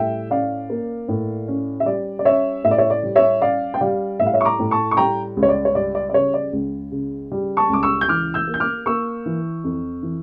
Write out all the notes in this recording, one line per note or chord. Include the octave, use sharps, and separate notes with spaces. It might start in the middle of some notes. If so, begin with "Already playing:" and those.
Already playing: A2 G3 E5 G5
C#4 D5 F5
A#3
A2
C#4
E5
G3 D5
D5
C#4 C#5 E5
A2 E5
D5
C#5 E5
D5
G3
C#5 E5
C#4 D5 F5
G5
G3 D5 F5
A2 E5
F5
C#5 E5
C#6
A#5 D6
A2
A5 C#6
C#6
G3 G5 A#5
C#2
C#5
D5
C#5
G3 D5
D5
D5
C#3 C#5
D5
C#2
C#3
G3
A5 C#6
C#2 D6
C#6 E6
G6
E3 D6 F6
E6 G6
A#3
G6
D6 F6
A#3 C#6 E6
E3
F2
E3